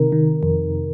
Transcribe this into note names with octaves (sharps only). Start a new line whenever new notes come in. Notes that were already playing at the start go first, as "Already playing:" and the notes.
Already playing: C3 D#3 A#4
D#3
F2